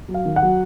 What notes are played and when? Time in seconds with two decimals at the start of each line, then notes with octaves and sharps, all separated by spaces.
0.09 F#3
0.14 F5
0.25 D#3
0.36 F#5
0.42 F#3